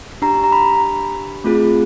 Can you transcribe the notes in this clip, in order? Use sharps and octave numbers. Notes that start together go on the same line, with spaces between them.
D4 G4 A#5
A#5
B5
A3 C4 F4 G#4